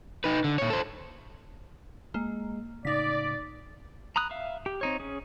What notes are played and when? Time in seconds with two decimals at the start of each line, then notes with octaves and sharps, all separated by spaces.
0.24 D#4 B4
0.44 D3
0.58 A#2 C#5
0.70 A4 C5
2.14 G#3 A#3
2.85 A2 C#3 D#4 D5 B6
4.16 A#5 B5 D#6 F#6
4.31 E5 F5
4.66 G4
4.81 C4 D#4 C#5
5.00 C#4 G#4